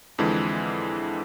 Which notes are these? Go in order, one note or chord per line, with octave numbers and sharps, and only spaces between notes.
F2 D3 E3 G#3